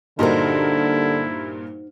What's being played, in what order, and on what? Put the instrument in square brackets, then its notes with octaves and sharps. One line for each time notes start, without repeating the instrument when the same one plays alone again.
[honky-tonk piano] G2 A#2 A#4 [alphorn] D3 [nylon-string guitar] D#4 F#4 C5 [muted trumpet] E4